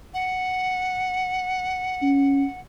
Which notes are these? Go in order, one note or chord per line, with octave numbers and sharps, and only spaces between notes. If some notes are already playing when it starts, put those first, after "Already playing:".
F#5
C#4